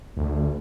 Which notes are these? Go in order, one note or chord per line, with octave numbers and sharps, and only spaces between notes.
D2